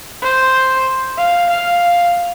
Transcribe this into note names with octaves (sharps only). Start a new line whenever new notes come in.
C5
F5
F5